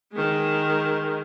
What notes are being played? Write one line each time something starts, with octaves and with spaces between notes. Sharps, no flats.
D#3 G#3